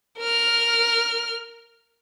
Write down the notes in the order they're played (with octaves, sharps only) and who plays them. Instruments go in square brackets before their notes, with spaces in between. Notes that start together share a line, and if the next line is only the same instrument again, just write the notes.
[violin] A#4 F6